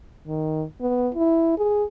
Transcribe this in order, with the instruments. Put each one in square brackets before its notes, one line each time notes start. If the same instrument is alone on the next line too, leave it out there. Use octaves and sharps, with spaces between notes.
[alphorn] D#3
B3
E4
G#4